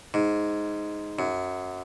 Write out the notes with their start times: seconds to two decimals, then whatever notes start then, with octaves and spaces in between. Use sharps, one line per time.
0.14 G#2
1.19 F#2